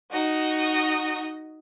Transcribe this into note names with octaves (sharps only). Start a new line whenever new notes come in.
D#4 F#4 D#5